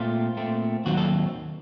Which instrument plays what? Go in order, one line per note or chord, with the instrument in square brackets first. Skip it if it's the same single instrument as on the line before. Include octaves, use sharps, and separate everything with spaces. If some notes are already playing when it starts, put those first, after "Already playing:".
Already playing: [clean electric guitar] A#2 A3 C4 F4
A#2 A3 C4
D#2 D#3 F#3 C4 F#4
A4